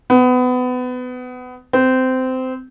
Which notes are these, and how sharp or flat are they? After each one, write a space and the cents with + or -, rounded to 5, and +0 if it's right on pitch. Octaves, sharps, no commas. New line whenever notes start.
B3 +25
C4 -20